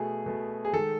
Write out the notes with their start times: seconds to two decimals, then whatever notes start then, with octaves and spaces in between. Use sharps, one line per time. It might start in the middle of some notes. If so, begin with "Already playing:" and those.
Already playing: B2 A3 G#4
0.26 B2 A3
0.65 G#4
0.73 D#3 G#3 A4